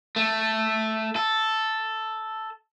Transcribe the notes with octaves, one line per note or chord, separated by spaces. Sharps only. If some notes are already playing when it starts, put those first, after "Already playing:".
A3
A4